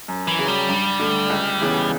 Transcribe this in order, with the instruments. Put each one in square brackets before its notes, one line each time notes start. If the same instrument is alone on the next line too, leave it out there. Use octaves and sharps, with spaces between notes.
[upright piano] F#2
[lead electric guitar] E3
[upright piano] C#3 F#3
[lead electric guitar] G3
[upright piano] G2
D3 A3
C#2
C#3 E3 B3